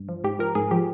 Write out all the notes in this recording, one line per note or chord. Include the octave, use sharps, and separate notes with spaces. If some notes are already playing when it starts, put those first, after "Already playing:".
Already playing: G2
F3
G#2 G4
F3 A#4
G#2 G#4
F3 G4